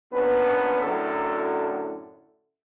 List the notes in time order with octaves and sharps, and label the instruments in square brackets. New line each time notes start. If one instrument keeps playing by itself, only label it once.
[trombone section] A#1 B3 C#4 D4 B4
F#2 A2 D3 F#3 E4 A4